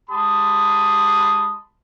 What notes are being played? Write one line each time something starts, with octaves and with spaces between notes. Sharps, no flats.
G#3 G4 A5 B5 C6 D#6